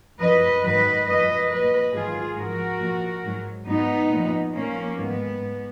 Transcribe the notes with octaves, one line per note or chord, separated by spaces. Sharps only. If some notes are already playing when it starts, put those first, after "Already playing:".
F#2 F3 B4 D#5
G#2 D#3 F#3 B4 D#5
F#2 F3 B4 D#5
A#2 F#3 B4 D#5
G#2 D#3 F#3 F4 G#4
G#2 F3 F#4 A#4
A#2 F3
G#2 F#3
G#2 F#3 B3 D#4
A#2 F3
A#2 F3 A#3 C#4
G#2 D#3 F#3 G#3 B3
G#2